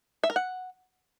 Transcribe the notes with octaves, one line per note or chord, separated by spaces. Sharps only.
E5
A#4
F#5